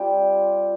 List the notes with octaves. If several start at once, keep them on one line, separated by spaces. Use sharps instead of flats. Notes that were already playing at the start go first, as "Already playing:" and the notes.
Already playing: G3 C4 F4 G5